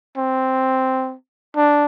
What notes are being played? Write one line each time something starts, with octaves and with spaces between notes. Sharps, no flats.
C4
D4